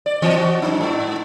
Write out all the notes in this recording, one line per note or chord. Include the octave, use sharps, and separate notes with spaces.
D5
E3 C4 D#5
F#4
F#2 D#4
G#2